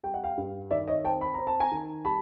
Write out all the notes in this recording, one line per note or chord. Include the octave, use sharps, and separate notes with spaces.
G3 G5
F#5
F5 G5
G2
D#3 D5 E5
C#5 D#5
C4 G5 A5
B5
C4 A#5
A5
G#5 A#5
D#3
G3 A5 B5